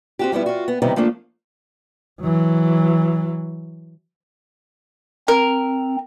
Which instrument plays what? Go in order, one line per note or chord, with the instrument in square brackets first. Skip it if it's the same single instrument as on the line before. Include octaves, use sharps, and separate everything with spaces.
[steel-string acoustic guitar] C4 F#4 G4
F3 G3 B3 E4
F4 F#4
B3
C3 D#3 G3 B3 D#4 E4
F3 A3 A#3 D4
[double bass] E3 F#3
[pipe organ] C4 [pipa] A#4